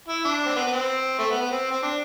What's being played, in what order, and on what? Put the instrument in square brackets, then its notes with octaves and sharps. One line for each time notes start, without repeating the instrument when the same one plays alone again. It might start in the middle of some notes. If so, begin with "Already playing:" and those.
[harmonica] E4
D4
C4
B3
B3
C4
A3
B3
B3
C4
C4
D4